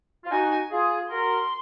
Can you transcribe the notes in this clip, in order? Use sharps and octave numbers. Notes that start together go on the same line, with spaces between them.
F4
D#4 F#4 G#5
F4 G#4
F#4 A#4 C6